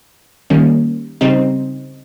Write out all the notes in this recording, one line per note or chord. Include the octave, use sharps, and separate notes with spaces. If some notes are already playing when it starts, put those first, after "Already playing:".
D#3 G3 A#3 C#4
C#3 G3 C4 D#4